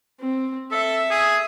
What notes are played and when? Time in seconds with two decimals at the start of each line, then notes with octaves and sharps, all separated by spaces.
0.21 C4
0.72 A4 E5
1.11 G#4